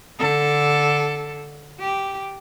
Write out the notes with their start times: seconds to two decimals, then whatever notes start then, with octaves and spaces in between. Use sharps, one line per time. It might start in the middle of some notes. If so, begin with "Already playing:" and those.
0.19 D3 A4
1.80 G4